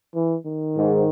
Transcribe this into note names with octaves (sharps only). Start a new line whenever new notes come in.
E3
D#3
G#2